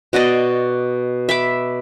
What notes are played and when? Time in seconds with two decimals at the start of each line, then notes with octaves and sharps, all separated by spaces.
0.13 B2 F#4 D5 D#5
1.29 E5 B5 D6